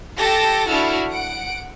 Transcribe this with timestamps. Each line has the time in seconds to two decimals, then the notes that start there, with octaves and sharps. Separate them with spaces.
0.17 G4 A4 A5 A#6
0.69 D4 E4 F#4 A4 F6
1.11 F#5 D7